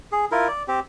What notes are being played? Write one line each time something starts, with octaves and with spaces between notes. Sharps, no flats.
G#4
E4 F4 A#4
D5
C4 G4